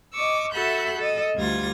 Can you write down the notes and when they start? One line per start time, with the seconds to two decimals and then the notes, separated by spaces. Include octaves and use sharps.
0.13 D#5 C#6 D6 E6
0.52 F#4 A4 E5 B5 F#6 G6
0.96 A4 D#5
1.36 D2 G3 F4 G#6 A#6